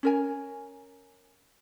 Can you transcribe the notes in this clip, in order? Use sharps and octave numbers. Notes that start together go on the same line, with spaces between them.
C#4 A#4 G#5